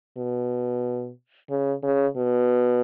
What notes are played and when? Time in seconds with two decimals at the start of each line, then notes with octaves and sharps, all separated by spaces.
0.17 B2
1.50 C#3
1.83 C#3
2.17 B2